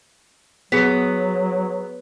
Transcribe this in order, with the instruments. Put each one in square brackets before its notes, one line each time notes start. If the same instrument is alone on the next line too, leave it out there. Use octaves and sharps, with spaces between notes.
[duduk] F#3 [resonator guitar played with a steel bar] B3 [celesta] G#4 B6